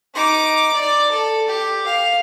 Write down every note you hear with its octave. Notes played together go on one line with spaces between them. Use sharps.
D#4 D6
D5
A4
G4
F5